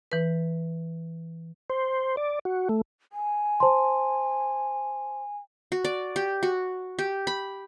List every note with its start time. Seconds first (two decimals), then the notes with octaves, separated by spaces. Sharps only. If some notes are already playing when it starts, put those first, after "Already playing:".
0.12 E3 B4
1.70 C5
2.17 D5
2.45 F#4
2.69 A3
3.12 G#5
3.60 C5 A5 C6
5.72 F#4
5.85 D5
6.16 G4
6.43 F#4
6.99 G4
7.27 B5